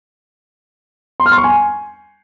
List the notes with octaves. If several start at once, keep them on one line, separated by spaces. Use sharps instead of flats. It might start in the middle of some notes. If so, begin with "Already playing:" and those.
C6
F6
C6
C#6
G#5